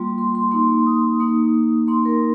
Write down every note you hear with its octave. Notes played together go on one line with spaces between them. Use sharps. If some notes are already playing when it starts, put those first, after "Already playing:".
Already playing: G3 A#3 F4 C6
C6
C6
A#3 D#4 C6
D#6
A#3 D#4 D#6
A#3 D#4 C6
A#4